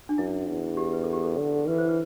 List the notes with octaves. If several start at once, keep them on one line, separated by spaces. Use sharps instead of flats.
D4
F#2 E4
E2
G4
B4
A4
G4
A4
D3
E3 B4
C5
B4